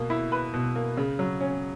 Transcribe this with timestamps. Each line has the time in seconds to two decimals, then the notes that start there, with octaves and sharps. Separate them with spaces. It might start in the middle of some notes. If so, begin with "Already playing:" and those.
Already playing: B2 A#3
0.10 E4
0.32 B4
0.54 B2
0.76 A#3
0.97 C#3
1.19 F#3
1.41 C#4